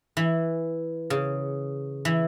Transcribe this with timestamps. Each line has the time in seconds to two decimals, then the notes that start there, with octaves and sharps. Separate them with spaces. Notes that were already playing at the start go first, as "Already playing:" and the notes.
0.17 E3
1.10 C#3
2.05 E3